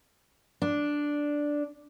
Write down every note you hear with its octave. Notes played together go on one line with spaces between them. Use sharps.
D4